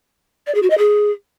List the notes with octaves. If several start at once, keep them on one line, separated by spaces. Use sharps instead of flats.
D5
G#4
F#4
D#5
G#4